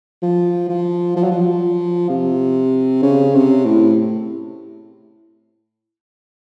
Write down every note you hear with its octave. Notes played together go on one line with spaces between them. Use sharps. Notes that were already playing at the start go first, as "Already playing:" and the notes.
F3
F3
F3
F#3
F3
C3
C#3
C3
A2